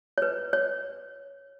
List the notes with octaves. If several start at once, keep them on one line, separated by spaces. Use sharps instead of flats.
C#5
B4
C#5